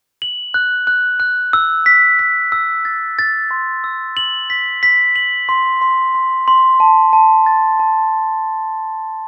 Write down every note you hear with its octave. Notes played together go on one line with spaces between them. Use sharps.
F#7
F#6
F#6
F#6
E6
B6
B6
E6
A6
A6
C6
E6
F#7
B6
B6
F#7
C6
C6
C6
C6
A5
A5
A6
A5